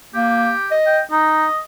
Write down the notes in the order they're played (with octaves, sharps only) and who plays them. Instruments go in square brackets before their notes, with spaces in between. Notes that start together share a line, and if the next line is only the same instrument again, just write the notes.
[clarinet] A#3 [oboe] G4
[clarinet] D#5
[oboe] G5
[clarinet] D#4 [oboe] D#5